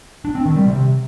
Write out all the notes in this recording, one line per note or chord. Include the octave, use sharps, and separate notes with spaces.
D4
C4
D#3
G3
C3